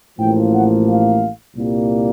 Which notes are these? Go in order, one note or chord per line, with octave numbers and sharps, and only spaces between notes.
A1 A2 F3 A#3 G5
F#5
F5
C2 A#2 G3 A#3